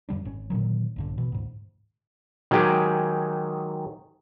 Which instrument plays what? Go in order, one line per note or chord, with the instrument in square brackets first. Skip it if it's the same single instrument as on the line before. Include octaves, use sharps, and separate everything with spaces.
[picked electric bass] F#2 D3 G3 D4
G#1 C#4
A#2 D3 D#3 F#3
A#1 G2 D3
B2 E3
D2 G#2
[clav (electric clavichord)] D#3 F#3 G#3 G4 G#4 G5